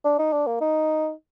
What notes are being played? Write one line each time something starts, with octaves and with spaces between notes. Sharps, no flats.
D4
D#4
D4
A#3
D#4